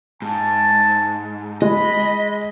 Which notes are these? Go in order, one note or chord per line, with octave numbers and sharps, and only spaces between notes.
G#2 A5
G#3 D#5 B5